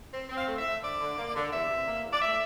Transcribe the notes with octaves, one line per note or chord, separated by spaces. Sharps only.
C4
C4
F5
A3
E5
A3
D3 D5
D3
A#3
D3
E2 E5
C3
A#3
E2
D5
A3 E5